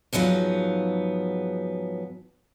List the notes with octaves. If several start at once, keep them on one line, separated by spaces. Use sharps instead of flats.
G#2 F3 F#3 B3 D#4